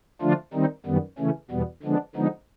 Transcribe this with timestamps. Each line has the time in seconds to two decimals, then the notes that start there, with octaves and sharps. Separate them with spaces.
0.22 D3 F3 A3 D4 F4
0.54 D#3 G3 C4 D#4
0.86 F#2 D#3 G3 B3
1.18 C#3 E3 A3 C#4
1.50 E2 B2 G3 B3
1.83 D3 F3 G#3 B3 D4
2.15 D3 F3 G#3 B3 D#4